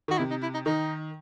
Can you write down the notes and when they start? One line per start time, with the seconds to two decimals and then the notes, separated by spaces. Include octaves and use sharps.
0.08 D#3 F#4
0.19 C3 E4
0.31 D#4
0.43 E4
0.54 D#4
0.66 D#3 D#4